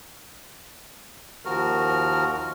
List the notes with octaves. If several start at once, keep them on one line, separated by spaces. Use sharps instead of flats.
D#2 F3 F#4 A#4 F6